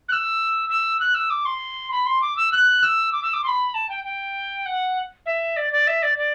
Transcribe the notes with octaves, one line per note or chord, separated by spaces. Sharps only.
F#6
E6
E6
F#6
E6
D6
C6
B5
C6
D6
E6
F#6
E6
D6
E6
D6
C6
B5
A5
G5
G5
F#5
E5
D5
D5
E5
D5
D5